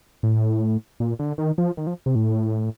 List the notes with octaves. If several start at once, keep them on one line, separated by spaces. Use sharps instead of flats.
A2
A#2
D3
D#3
F3
D#3
F3
C3
A2